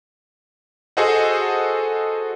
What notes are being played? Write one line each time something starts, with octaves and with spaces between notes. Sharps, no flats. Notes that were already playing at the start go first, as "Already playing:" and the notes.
F#4 G#4 A4 C5 D#5 F#5